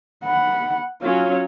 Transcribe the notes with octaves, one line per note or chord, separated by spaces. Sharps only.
F#5 B5
F#3 C#4 F4 C#5